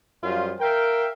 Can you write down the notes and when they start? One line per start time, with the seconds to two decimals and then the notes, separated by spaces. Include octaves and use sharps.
0.23 F#2 F3 G3 F4
0.60 A#4 E5 F5 G5